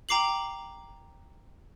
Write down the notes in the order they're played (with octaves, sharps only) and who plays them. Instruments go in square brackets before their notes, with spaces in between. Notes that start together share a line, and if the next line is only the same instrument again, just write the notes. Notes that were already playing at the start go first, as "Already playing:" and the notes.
[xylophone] G5 A#5 D6 C7 F#7